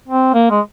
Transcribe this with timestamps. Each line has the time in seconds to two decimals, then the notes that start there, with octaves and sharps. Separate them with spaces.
0.08 C4
0.34 A#3
0.50 G#3